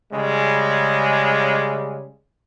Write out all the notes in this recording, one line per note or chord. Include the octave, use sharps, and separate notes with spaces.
C#3 G3 G#3